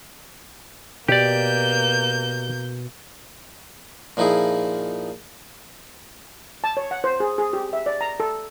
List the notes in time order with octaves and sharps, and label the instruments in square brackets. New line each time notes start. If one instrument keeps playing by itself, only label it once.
[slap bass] B2 [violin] A#3 G6 [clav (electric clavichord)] G4 D5
[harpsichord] A#2 F3 D#4 E4 G#4
[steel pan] A5
C#5
F#5
C5
G#4
G#4
G4
E5
D5
A#5
A4